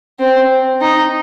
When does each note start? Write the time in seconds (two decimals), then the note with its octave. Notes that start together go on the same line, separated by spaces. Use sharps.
0.20 C4
0.81 D#4